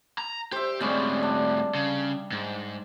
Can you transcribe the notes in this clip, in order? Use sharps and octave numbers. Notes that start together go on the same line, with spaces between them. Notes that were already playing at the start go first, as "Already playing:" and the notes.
A#5
G4 C5 E5
A2 G3 G#3 C4 C#4
D4
C#3
G#2